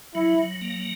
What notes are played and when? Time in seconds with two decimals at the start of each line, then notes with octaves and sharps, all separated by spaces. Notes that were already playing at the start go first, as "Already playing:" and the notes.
0.15 F#3 E4
0.38 F#3
0.61 A#3